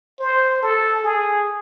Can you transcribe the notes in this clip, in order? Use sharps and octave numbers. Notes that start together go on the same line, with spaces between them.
C5
A4
G#4